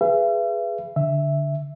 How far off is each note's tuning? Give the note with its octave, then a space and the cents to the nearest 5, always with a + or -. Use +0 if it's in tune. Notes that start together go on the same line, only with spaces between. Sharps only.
G#4 +0 B4 +0 E5 +45
D3 -15 E5 +0